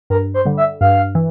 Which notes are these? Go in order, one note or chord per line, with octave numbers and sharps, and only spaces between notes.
G2 A#4
C5
D3 G3
E5
G2 F5
E3